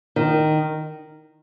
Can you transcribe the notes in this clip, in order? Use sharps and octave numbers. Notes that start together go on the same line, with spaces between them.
D#3